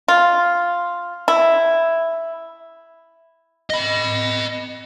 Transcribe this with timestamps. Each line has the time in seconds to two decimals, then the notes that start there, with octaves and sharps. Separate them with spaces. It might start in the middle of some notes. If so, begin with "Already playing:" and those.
0.08 F4
1.28 E4
3.70 D#5 B5